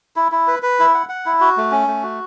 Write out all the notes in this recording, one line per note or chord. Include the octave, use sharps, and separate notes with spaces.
E4
E4
B4
B4
E4
F#5
F#5
E4
F#4
A3
C#4
A3
F#4